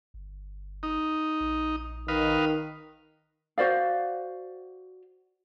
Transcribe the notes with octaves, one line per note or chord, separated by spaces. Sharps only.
G1
D#4
A#1
D#3 B4 D#5 F5
F#4 C5 D5 F5